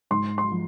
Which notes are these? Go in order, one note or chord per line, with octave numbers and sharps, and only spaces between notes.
G#2 C6
C6
F3